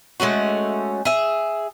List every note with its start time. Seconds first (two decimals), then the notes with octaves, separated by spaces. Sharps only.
0.20 G#3 A3 C#4 F#4
1.05 G#4 E5